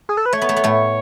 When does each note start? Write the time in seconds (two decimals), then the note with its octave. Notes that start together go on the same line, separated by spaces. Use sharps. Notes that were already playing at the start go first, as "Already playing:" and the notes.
0.09 G#4
0.17 A4
0.26 B4
0.33 A3 C#5
0.42 B3
0.49 A3
0.57 B3
0.64 A2 A3